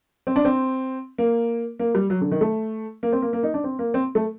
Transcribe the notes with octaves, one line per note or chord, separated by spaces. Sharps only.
C4
D4
C4
A#3
A#3
G3
F#3
D3
D#3
A3
A#3
C4
A#3
A#3
D#4
D4
C4
A#3
C4
A3